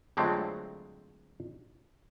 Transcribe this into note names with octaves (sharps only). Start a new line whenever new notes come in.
F2 D3 F#3 G#3 A3 C4